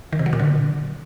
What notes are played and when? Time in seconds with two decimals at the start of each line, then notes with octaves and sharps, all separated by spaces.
0.13 D#3
0.19 C3
0.26 F#3
0.33 A#2
0.40 D3